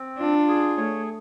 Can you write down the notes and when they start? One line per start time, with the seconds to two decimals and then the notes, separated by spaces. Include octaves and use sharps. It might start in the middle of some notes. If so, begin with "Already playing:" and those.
Already playing: C4
0.19 D4 F4
0.48 G#4
0.77 A3 C#5